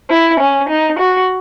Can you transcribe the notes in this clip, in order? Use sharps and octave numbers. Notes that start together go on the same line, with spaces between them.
E4
C#4
D#4
F#4